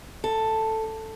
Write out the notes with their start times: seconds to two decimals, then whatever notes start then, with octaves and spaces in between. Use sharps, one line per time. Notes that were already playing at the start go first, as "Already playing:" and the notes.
0.24 A4